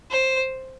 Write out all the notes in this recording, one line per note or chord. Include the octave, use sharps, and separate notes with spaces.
C5